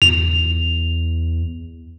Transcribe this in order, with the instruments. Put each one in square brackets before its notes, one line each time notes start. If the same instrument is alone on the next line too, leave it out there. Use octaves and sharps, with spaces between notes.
[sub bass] E2 [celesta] F7